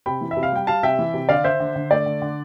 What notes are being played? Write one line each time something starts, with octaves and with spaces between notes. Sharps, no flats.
C3 G5 B5
E3
E5
C3
F5
G3 G5
G3 F5 A5
C3 E5 G5
E3
C3
D3 D5 F5
D3 C5 E5
D3
D3
A3 D5
D3
D3